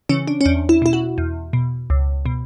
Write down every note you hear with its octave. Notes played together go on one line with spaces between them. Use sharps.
C#3 E3 C#4
D4
C#4
E2 D4
E4
B2 E4
F#4
E2
B2
C#2
B2